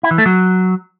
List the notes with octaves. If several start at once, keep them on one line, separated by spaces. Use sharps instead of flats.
E4
E3
A3
F#3